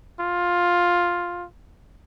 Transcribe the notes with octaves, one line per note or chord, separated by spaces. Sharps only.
F4